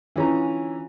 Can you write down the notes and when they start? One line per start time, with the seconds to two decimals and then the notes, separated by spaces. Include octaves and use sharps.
0.16 E3 C#4 D4 F4 G#4 A#5